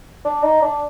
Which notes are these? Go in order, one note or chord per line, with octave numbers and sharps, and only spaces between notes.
D4
D#4
D4